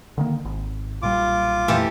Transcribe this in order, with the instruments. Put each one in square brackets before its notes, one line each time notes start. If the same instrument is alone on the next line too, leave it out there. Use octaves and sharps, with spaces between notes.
[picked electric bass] D3 D#3 A#3
G#1
[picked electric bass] B1 A#2 G3 [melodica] F4 D6
[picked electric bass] F2 A#2 A3 [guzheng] E3 G4 A4